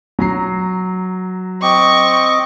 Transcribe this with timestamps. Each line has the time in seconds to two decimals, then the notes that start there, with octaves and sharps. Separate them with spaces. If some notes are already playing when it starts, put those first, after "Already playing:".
0.19 F#3 A#5 C7
1.62 C4 D#5 C#6 D6